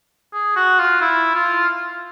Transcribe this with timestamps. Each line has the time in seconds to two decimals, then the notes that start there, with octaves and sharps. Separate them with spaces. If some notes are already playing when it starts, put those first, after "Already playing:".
0.33 G#4
0.56 F#4
0.79 F4
1.01 E4
1.35 F4